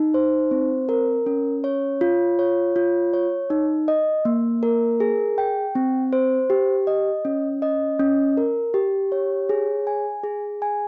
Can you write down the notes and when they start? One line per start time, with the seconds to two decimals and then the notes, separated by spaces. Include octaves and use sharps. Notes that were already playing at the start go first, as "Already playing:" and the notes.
Already playing: D#4
0.14 C5
0.51 C4
0.89 A#4
1.26 C#4
1.64 C#5
2.01 F4
2.39 C#5
2.76 F4
3.14 C#5
3.50 D#4
3.88 D#5
4.25 A#3
4.63 A#4
5.00 G#4
5.38 G5
5.75 C4
6.13 C5
6.50 G4
6.87 D#5
7.25 C#4
7.62 D#5
8.00 C#4
8.37 A#4
8.74 G4
9.12 C#5
9.49 G#4
9.87 G#5
10.24 G#4
10.62 G#5